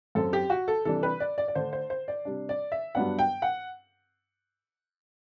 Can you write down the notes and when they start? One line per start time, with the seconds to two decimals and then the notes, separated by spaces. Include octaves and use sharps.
0.15 F#2 F#3 C4 A4
0.33 G4
0.50 F#4
0.68 A4
0.85 C3 E3 G3 D4 A4
1.03 B4
1.20 D5
1.38 D5
1.48 D5
1.55 D3 A3 D4 C5
1.73 C5
1.90 C5
2.08 D5
2.25 C3 G3 D4
2.49 D5
2.72 E5
2.95 G2 F#3 B3 D4 F#5
3.19 G5
3.42 F#5